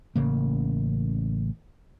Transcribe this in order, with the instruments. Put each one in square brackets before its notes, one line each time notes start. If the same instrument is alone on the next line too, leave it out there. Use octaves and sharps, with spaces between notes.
[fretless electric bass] A1 C#3 A#3